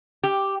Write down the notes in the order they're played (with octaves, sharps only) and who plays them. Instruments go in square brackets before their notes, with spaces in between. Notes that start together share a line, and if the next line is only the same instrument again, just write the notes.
[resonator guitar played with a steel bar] G4